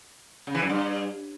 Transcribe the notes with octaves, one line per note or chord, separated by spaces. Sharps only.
C#3
E3
F#2
G2